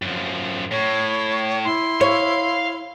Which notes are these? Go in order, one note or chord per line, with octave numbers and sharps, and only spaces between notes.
F#2 F3
A2 C#5
E4 C6
C#5 F5